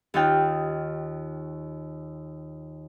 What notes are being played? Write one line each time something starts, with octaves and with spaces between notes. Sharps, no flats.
D#2 D#4 F4 G5